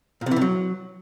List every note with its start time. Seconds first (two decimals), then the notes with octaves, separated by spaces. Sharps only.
0.21 A#2
0.26 C3
0.31 E3
0.36 C3
0.41 F#3